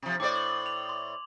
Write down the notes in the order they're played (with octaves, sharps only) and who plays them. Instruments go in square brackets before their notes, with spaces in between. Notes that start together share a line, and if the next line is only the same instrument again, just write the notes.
[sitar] C3 F3
[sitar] A2 C5 D5 [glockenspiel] D6 G#6
[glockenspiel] F#7
F7
C6